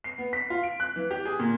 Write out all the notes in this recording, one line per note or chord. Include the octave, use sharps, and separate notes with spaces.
C7
B3
B6
F4
D7
F#6
E3
G4
G#4
A#2